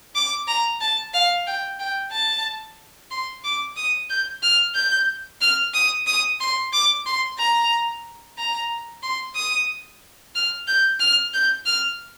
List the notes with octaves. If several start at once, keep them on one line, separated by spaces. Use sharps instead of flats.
D6
A#5
A5
F5
G5
G5
A5
C6
D6
D#6
G6
F6
G6
F6
D#6
D#6
C6
D6
C6
A#5
A#5
C6
D#6
F6
G6
F6
G6
F6